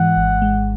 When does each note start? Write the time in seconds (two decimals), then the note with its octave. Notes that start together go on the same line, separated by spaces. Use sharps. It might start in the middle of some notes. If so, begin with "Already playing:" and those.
Already playing: G#2 E3 G#3 F#5
0.16 G#1
0.42 G#3